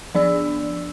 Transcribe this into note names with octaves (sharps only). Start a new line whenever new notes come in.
F3 D4 D5 E6